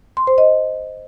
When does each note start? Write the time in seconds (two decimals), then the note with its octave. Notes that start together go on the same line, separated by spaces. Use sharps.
0.17 C6
0.27 C5
0.38 D#5